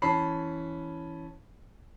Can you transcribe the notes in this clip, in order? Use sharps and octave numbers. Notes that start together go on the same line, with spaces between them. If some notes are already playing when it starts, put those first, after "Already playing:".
E3 C#4 A5 B5 C7